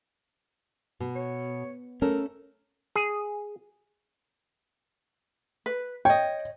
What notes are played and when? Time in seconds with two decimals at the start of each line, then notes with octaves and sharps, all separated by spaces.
1.00 B2
1.16 C#5
2.02 A3 C#4 A4 A#4
2.96 G#4
5.66 B4
6.05 C#5 D#5 G5